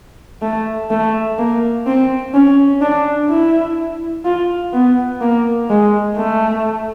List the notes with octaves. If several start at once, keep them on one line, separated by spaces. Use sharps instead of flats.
A3
A3
A#3
C4
C#4
D4
E4
F4
B3
A#3
G#3
A3